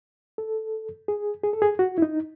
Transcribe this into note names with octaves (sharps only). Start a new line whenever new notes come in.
A4
G#4
G#4
A4
G#4
F#4
E4
D#4